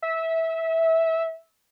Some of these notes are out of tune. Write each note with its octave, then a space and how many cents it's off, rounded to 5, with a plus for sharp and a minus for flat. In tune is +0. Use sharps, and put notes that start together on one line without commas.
E5 -15